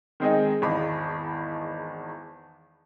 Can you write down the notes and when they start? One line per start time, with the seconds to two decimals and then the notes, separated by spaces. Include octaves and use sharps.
0.20 D#3 G#3 C4 D#4 G#4 D#5
0.62 G#1 E2 D#5 A5 B5 D6